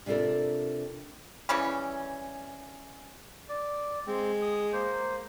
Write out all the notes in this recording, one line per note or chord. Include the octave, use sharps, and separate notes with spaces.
C3 D4 F4 A4 A#4
C#3 E3 G3 C#4
D5
G#3 C4
D#6
A#3 C5